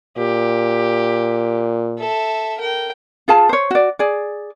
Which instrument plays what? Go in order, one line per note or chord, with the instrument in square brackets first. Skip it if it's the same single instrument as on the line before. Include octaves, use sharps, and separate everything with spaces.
[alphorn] A#2 [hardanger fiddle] G4
[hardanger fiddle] A4 E5
A#4 G5
[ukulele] F4 G#4 F5 A5
C5 C#5
F#4 D5
G#4 D5